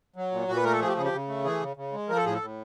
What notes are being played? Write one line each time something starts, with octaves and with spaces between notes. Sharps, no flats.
F#3
A#2
A#2 F#4
B4
A3 A#4
A4
F3 G#4
G4
C#3 G#4
G4
C#3
A3
E3 G#4
C#3
C#3
G#3
F3 A#4
A4
A2 G#4
A4
A2